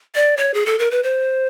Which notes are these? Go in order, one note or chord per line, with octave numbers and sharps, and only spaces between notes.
D5
C#5
G#4
A4
A#4
B4
C5